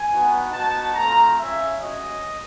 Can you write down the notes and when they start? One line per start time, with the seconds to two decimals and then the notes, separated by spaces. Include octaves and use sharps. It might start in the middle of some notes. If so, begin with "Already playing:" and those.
Already playing: G#5
0.10 B3 D#4 F#4
0.52 B3 D#4 F#4 A5
0.94 A3 C4 F4 A#5
1.37 G#3 C#4 F4 E5
1.79 G#3 C#4 F#4 D#5